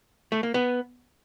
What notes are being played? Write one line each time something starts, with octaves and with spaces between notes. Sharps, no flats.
A3
A#3
B3